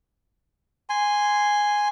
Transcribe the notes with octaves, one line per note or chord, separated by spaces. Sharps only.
G#5 C6